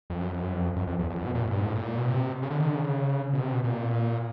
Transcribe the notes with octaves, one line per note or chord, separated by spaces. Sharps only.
F2
F#2
F2
F#2
F2
F#2
F2
E2
F2
F#2
B2
A#2
A2
G2
G#2
A2
A#2
B2
C3
C#3
D3
D#3
D3
C#3
B2
C3
B2
A#2